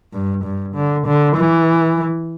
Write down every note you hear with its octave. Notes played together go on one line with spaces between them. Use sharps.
G2
G2
D3
D3
E3